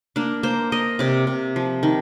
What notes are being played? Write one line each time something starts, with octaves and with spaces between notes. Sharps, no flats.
A#3 D4
A#3 C5
A#3 D#5
C3 D5
C3
F3
D#3